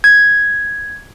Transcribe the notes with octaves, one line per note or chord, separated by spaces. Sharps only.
G#6